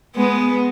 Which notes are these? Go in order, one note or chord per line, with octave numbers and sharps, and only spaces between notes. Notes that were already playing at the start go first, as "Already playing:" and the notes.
G#3 B3